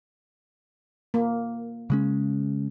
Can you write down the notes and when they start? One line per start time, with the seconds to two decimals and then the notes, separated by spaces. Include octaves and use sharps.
1.14 A#3
1.90 C#3 G#3 C#4